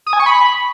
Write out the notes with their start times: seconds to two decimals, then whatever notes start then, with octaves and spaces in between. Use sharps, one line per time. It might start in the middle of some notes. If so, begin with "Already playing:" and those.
0.06 D#6
0.13 G#5
0.20 C#6
0.26 B5